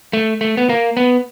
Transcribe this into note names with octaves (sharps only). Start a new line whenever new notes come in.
A3
A3
B3
A#3
B3